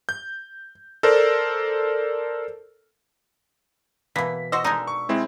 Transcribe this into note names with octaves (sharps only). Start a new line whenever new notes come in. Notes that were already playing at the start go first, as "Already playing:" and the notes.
G6
A4 A#4 C5 D5
B2 E3 A#3 B6
F#4 C5 D#5 E6
D3 G#3 D#4 A#4
C#6
G#3 C4 E4